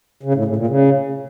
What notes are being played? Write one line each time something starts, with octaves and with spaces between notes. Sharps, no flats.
C#3
A2
A2
A#2
C#3